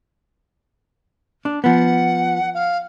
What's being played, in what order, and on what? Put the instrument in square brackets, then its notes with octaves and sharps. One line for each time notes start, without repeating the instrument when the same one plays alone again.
[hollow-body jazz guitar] D4
[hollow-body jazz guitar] F3 B3 [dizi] F#5
[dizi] F5